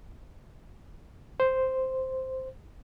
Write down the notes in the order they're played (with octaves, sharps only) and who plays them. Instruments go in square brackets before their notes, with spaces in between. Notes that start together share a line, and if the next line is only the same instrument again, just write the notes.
[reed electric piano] C5